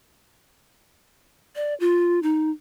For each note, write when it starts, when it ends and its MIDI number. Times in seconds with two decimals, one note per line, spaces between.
1.56 1.74 74
1.80 2.19 65
2.23 2.50 63